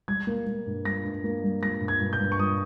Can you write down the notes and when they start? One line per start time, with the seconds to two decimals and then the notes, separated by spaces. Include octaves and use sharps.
0.08 G3 G#6
0.27 A#3
0.46 A#3
0.67 G2
0.85 G3 A#6
1.05 G2
1.24 A#3
1.43 G3
1.61 G3 A#6
1.81 G2
1.88 G#6
2.00 G2
2.13 G6
2.19 G2
2.32 C#6
2.39 G3 D#6